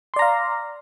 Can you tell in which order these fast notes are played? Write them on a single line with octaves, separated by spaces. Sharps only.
C6 D5 A#5 F5